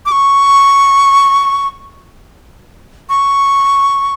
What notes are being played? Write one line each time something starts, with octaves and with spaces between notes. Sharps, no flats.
D6
C#6
C#6